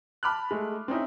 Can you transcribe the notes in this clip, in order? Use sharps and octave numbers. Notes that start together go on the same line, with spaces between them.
A5 B5 D6 F6 F#6
G#3 A3
C4 C#4 D#4 E4